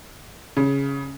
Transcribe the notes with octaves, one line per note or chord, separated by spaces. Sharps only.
C#3